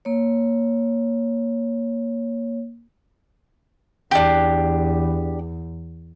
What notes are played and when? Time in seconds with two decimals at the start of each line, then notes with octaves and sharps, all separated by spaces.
0.05 A#3 C#5
4.11 E2 D4 G4